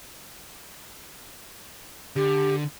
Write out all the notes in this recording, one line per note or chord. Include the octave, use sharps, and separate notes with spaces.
D3 G4